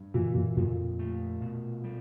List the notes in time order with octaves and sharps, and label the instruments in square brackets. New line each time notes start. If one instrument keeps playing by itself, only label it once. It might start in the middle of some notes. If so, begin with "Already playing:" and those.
Already playing: [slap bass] G2
[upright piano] A#2 [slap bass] E3
[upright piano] A#2
[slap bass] F2 [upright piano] A#2
[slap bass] A3
B2
G3